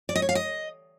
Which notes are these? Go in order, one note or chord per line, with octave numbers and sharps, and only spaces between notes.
D5
D#5
C#5
F5
D#5